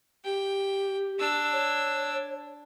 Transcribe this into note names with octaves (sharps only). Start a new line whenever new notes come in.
G4 G5
D4 E6
C#5